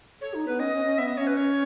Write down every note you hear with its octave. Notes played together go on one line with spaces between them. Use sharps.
A4 C#5
D#4
B3 B4
C#4 D#5
C#4
C#4
B3 E5
D#5
C#4 C#5
B4
C#5